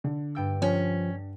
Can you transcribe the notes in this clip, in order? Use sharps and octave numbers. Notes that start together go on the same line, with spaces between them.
D3
G2 G5 E6
F3 C#4